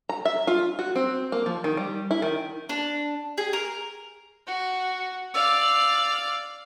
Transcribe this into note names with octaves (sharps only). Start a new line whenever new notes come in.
A#5
E5
F4
F#4
C4
A#3
F3
D#3
G3
E4
D#3
D4
G#4
A#4
F#4
D5 F5 E6